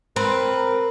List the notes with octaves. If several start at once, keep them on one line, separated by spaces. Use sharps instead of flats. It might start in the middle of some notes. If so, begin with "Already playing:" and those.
C4 A#4 B4